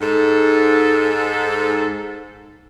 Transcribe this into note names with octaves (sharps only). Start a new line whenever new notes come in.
G#2 A4